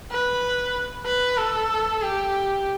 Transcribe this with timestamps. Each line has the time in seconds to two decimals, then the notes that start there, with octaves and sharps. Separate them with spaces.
0.11 B4
1.06 B4
1.37 A4
2.01 G4